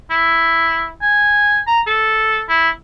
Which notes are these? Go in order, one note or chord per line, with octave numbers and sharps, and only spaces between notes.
E4
G#5
A#5
A4
E4